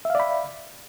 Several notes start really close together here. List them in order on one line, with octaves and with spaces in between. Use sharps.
E5 F5 D5 B5